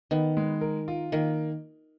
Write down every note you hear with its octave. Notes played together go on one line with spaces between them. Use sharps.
D#3 B3
G#3
A#4
F4
D#3 A#3